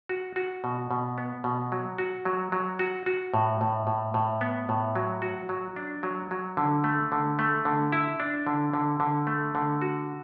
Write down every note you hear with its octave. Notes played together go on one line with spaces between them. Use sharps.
F#4
F#4
B2
B2
B3
B2
F#3
F#4
F#3
F#3
F#4
F#4
A2
A2
A2
A2
B3
A2
F#3
F#4
F#3
D4
F#3
F#3
D3
A3
D3
A3
D3
E4
D4
D3
D3
D3
A3
D3
F#4